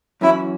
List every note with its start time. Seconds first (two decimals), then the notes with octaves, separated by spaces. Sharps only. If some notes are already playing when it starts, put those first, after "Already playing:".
0.21 F#2 E3 C#4 E4 F#4